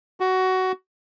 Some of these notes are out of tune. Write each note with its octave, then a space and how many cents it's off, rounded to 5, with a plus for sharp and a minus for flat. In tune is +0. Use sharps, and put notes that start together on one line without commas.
F#4 +15